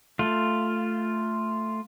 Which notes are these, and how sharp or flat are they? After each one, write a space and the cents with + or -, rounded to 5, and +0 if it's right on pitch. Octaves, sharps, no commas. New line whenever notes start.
A3 +5 F4 +0